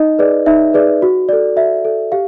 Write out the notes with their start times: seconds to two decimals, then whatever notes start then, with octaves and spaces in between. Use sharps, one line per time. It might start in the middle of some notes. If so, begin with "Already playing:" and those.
Already playing: D#4 D#5
0.19 G#4 B4 D5
0.46 D#4 E5
0.74 G#4 B4 D5
1.02 F#4
1.29 A4 D5
1.56 F#4 E5
1.85 A4 D5
2.12 G4 F5